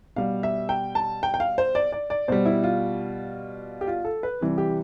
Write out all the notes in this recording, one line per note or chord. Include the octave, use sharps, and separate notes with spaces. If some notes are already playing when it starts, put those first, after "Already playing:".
B2 G3 F5
E5
G5
A5
G5
G5
F5
C5
D5
D5
D5
B2 G3 C5
E4
F4
G4
F4
A4
B4
C3 E3 G3
G4